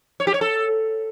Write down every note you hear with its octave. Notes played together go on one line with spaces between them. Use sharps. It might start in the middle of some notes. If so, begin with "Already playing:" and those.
C#5
G4
C#5
A4